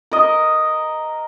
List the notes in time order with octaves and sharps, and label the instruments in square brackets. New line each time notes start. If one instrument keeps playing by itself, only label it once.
[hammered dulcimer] A#4 D#5